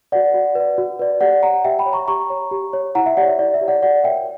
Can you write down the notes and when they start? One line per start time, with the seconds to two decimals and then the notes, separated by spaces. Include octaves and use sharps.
0.12 F#4 B4 D5 F#5
0.34 F#4
0.55 B4 D5
0.78 F#4
0.99 B4 D5
1.21 G4 D5 F#5
1.43 C#5 F#5 A#5
1.64 G4 E5 G5
1.79 G5 B5
1.86 C#5
1.93 A#5 C#6
2.08 G4 A#5 C#6
2.30 C#5
2.51 G4
2.73 C#5
2.95 E4 F#5 A#5
3.06 E5
3.17 G4 C#5 D5 F#5
3.28 E5
3.39 E4 D5
3.54 E5
3.61 G4 C#5
3.68 D5 F#5
3.82 F#4 D5 F#5
4.04 A#4 C#5 E5 G5